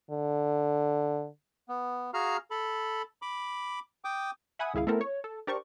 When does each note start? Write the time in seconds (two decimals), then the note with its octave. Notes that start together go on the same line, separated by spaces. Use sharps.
0.11 D3
1.69 B3
2.14 F#4 G#4 F5 A#5 F6
2.51 A4 B5
3.22 B5 D6
4.05 G5 D6 D#6
4.59 E5 F#5 G#5 B5 D#6
4.74 G#1 C#2 E4 G#4 F5
4.87 A3 B3 C4 E4 A4 A#4
5.01 C#5
5.24 A4
5.47 D4 G4 A#4 C5 D5 C#6